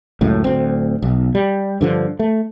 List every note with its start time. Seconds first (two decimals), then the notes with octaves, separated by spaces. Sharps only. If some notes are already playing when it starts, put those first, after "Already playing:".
0.21 C#2 F#2 A2
0.45 D1 D2 C4
1.02 B1
1.35 G3
1.81 G2 D3 F3
2.19 A3